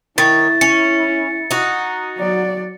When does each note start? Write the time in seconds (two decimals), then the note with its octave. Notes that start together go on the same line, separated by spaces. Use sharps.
0.18 D#3 E4 C#5 A6
0.61 C#4 C#7
1.51 D#4 F#4
2.18 F#3 D5